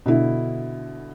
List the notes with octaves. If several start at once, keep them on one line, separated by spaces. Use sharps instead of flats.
B2 D3 E4